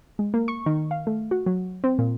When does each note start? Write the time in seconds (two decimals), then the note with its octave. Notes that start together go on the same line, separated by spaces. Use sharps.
0.19 G#3
0.34 A#3
0.48 C#6
0.66 D#3
0.91 F5
1.07 A3
1.31 F#4
1.46 F#3
1.84 C4
1.99 A#2